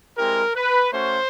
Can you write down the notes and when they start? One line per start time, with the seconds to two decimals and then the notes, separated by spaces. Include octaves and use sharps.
0.17 G#3 C4 E4 G4 A#4
0.55 B4
0.92 A3 C#4 F#4 C5